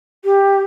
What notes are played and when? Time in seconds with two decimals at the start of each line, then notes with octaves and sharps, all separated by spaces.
0.24 G4